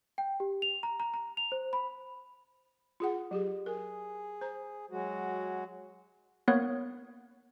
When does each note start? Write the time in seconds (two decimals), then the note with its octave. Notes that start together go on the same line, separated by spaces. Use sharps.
0.18 G5
0.40 G4
0.62 F7
0.83 A#5
1.00 A#5
1.14 A#5
1.37 F7
1.52 C5
1.73 B5
3.00 F4 G#4 F#5
3.31 F#3 G4 G#4
3.66 G#4 A#4
4.41 C5 A#5
4.91 F#3 G#3 F#4
6.48 A#3 B3 A#4 C#5 D#6 F#6